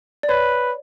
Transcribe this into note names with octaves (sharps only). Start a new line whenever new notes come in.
D5
B4 C#5